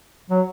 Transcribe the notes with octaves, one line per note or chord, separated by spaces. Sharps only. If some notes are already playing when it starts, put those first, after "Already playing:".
F#3